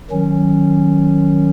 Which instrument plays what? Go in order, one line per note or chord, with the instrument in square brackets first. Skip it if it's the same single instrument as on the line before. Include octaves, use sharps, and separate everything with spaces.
[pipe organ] D#3 F#3 C#4